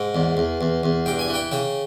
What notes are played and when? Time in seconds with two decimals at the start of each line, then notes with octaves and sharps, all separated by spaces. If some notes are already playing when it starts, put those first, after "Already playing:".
Already playing: G#2 G5
0.15 E2
0.37 E2
0.61 E2
0.83 E2
1.06 G2 G5
1.19 G#5
1.28 E3
1.34 G5
1.51 C#3 G5